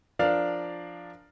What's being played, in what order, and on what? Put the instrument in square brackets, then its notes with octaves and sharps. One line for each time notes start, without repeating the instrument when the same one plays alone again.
[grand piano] F3 D4 A#4 D5 F5